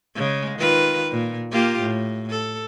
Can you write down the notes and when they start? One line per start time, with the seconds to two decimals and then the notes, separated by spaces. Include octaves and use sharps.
0.15 C#3 G#3
0.59 D#3 F4 B4
1.11 A#2
1.52 A#3 F4 G4
1.80 A2
2.30 A4